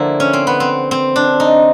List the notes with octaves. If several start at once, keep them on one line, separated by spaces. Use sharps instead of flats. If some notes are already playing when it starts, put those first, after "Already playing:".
Already playing: D3 F3 A#3 E4
C#4
C4
B3
C4
C4
D4
D#4